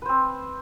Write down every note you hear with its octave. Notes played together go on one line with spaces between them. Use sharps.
C4 B4 C5